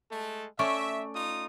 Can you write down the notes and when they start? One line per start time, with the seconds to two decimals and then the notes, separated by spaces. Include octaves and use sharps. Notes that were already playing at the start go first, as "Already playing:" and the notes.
0.11 G#3 A3 A4
0.59 A3 C#4 D5 E5
1.15 D#4 F4 D#6